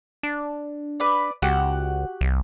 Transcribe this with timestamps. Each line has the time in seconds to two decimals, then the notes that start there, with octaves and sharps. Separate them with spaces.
0.23 D4
1.00 B4 D5
1.42 C#2 F#4 G4 F#5
2.21 C2